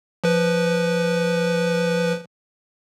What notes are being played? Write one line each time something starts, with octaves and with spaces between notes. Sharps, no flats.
F3 B4